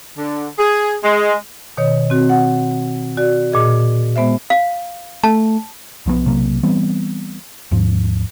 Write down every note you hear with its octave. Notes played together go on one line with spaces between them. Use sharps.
D3
G#4
G#3
B2 D#3 C#5 D#5
C4 F#4
F#5
F#4 D5
A#2 G#4 D#5
G#3 B3 C5 E5
F5
A3 A5
B1 F3 F#3 B3
B1 C3 F#3 A#3
E3 G3 B3 C4
D#2 G#2 F3